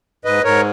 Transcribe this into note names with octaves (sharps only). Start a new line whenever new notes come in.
G#2 B4 D#5
G#2 A#4 C#5